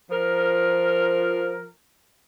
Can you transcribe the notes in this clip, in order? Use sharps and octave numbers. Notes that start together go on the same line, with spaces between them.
F3 A#4